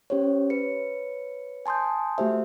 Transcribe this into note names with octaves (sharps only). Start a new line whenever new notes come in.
C#4 G4 C5 C#5
B4 C#5 C#7
G#5 A5 C6 D#6 G6
A3 F#4 G4 C5 E5